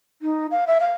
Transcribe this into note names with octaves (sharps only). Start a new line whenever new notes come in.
D#4
F5
E5
F5